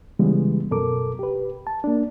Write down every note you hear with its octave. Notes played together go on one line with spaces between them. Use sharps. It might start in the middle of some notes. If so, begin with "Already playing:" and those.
C#3 E3 G3 G#3 B3
F#2 B2 A4 A#4 D6
G4 B4
A5
A#3 D4